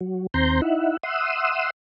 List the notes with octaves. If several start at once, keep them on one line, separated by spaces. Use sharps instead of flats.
F#3
D#2 C4 A#5 C6 G6
D#4 E4 E5 F#5
E5 F#5 C6 D#6 E6